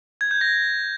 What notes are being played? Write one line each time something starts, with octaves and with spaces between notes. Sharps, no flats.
G#6
G6
A#6